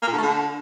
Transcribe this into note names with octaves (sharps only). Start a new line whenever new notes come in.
A#3
A#2
D3
A3
D3